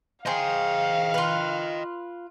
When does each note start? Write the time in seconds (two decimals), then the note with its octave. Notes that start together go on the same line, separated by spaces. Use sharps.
0.26 G#4 C5 D#5 F5 G5
1.14 F4 B4